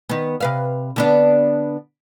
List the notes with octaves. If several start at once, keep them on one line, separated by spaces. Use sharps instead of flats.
D#3 B3
C3 B4 F5
D3 B3 D4